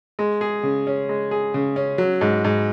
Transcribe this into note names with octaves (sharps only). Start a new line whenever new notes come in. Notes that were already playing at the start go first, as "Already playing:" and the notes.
G#3
G#4
C#3
C#4
G#3
G#4
C#3
C#4
F#3
G#2
G#2